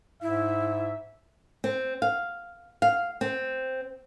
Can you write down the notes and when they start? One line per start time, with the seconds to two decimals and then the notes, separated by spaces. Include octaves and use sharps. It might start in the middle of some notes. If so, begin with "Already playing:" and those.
0.22 G#2 E4 E5
1.64 C4
2.02 F5
2.82 F5
3.21 C4